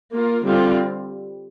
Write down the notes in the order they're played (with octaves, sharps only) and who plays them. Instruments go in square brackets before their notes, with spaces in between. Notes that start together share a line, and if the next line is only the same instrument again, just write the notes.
[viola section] A#3 F4 A#4
D3 G3 C4 F4